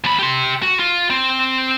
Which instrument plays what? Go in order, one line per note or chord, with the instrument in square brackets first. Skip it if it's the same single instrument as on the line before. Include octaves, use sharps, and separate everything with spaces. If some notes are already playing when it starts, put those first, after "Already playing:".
[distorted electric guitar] D#2 B5
G4 C6
F#4
F4
C4